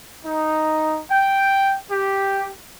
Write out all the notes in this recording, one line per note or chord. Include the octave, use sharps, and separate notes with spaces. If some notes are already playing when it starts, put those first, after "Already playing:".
D#4
G5
G4